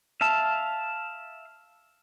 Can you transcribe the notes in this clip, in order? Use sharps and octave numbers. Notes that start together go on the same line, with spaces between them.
E5 F5 A5